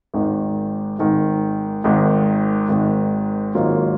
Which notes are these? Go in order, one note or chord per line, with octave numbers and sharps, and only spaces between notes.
G#1 G#2 D#3
G#1 G#2 D#3
G#1 G#2 D#3
G#1 G#2 D#3
G#1 G#2 F#3 A#3 F4